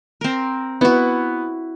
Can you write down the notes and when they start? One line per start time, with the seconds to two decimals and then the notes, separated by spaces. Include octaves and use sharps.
0.21 C4 A#4
0.81 B3 E4 F#4